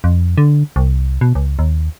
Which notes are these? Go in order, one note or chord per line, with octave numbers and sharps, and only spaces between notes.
F2
D3
C2
B2
C#2
D#2